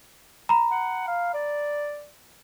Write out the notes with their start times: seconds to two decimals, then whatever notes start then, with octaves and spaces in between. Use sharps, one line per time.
0.49 A#5 B5
0.71 F#5
1.07 F5
1.34 D5